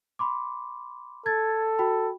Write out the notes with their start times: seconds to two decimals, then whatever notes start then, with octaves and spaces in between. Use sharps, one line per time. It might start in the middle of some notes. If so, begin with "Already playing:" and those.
0.19 B5 C6 D6
1.26 A4 G#6 A6
1.79 F#4 G5 B5